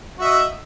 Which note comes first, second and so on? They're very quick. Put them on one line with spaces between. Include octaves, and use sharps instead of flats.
F#4 E5 D#5